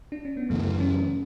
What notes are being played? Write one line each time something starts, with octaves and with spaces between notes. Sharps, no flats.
D4
C#4
B3
F#2 C#3 E3 A3
C#4